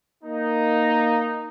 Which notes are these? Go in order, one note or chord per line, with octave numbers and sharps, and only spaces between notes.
A#3 D#4